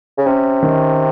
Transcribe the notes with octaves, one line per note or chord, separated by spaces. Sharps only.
C#3
C3 C#4
D#3